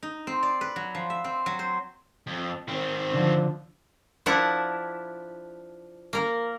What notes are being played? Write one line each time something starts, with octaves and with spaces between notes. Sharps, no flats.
D#4
C4
D5
B4
F#3
F3
E5
C4
F#3
C5
F2
D#3 C4
D3 F3
F3 D4 E4 F#5
A#3 A#4